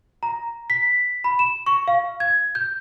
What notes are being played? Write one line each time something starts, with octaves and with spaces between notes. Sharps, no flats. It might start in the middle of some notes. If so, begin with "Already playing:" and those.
A#5
B6
B5
E7
C#6
F5
G#6
G6